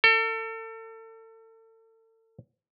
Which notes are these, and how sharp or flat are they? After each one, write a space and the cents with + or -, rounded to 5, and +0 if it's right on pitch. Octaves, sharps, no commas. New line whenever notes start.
A4 +35